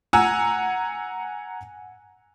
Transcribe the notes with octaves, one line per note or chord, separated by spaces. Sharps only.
F#5 G#5 A#5 E6